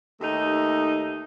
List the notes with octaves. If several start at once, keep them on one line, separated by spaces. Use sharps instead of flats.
D#2 A3 D#4